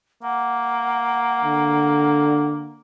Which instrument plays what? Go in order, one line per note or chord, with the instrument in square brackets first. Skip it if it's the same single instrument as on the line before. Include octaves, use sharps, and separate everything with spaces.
[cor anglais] A#3 [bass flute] F#5
[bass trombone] D3